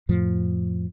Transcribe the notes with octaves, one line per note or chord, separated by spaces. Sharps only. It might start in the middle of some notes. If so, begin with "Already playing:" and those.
F2 A2 F3